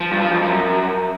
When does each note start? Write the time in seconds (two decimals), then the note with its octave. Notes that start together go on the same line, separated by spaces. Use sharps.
0.01 F3
0.11 G2
0.21 F3
0.32 F2
0.42 F#2